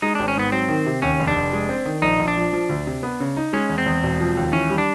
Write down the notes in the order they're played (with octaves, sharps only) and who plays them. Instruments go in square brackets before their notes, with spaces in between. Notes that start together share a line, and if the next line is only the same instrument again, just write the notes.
[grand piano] G#3 [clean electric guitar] D#4
[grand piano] G#1 [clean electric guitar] D4
[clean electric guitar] C#4
[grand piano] G#2 [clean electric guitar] B3
[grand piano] F#3 [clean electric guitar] C4
[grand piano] D#3
C3
[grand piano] D#2 [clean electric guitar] C#4
[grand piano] F1
[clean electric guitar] D4
[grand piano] F1
G#3
C4
D#3
[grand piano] A#1 [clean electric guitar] D#4
[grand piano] A#1
[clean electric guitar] D4
[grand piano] F3
F3
D2
C3
B3
C#3
D#4
[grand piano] G#3 [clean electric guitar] C#4
[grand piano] E2
[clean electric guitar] C4
[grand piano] E2
E1
F3
D#2
[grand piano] E3 [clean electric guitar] C#4
[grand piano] G3
[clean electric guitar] D4